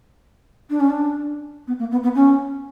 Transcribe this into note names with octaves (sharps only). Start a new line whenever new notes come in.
D4
C#4
D4
B3
A#3
B3
B3
C#4